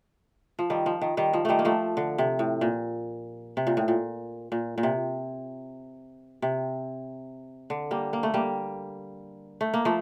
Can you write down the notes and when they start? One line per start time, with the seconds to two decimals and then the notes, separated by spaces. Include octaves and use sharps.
0.59 F3
0.70 D#3 G3
0.86 F3
1.01 D#3
1.17 D#3 G3
1.33 F3
1.45 D#3 G3 A3
1.59 A#3
1.65 F3 A3
1.97 D3
2.18 C3
2.39 A2
2.61 A#2
3.57 C3
3.67 A#2
3.77 A2
3.88 A#2
4.52 A#2
4.78 A#2
4.83 C3
6.42 C3
7.70 D3
7.91 G3 A#3
8.13 A#3
8.23 A3
8.34 G3 A#3
9.61 A3
9.74 A#3
9.85 F3 A3